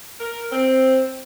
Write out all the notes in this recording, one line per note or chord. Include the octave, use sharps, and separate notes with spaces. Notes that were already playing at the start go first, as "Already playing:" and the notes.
A#4
C4